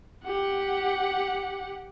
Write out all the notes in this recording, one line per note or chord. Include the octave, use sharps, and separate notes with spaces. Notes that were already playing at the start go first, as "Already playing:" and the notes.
G4 F#5